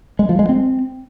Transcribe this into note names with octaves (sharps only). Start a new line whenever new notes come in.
G#3
F3
G#3
C4